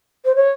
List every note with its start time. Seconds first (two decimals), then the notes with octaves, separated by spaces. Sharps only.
0.25 C5
0.35 C#5